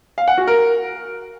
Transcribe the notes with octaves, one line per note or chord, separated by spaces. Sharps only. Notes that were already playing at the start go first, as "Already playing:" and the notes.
F5
F#5
F#4
A#4